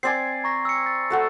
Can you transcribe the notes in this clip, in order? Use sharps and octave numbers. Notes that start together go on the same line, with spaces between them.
C4 D5 G#5 C7
A#5 C#6 A#6
E6 C#7
A6
A3 F#4 A4